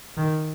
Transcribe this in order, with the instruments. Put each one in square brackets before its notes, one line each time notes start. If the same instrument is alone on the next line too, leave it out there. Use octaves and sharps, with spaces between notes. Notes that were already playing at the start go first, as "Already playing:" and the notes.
[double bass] D#3